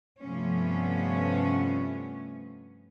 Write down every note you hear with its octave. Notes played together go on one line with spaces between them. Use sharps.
G2 C3 F3 A3 B3 C#4